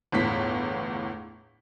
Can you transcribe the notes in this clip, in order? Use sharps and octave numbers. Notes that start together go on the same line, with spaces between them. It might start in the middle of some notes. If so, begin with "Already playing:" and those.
G1 E2 A2 B6